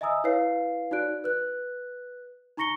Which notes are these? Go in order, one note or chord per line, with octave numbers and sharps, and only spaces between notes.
D#5 E5 G#5 A#5 D#6 E6
E4 B4 C#5 F5 C7
D#4 F#4 D5 F#6 D7
B4 F#6
D#4 A#5 C#6 A#6 C#7 G7